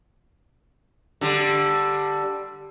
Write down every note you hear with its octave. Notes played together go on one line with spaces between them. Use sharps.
D3 G3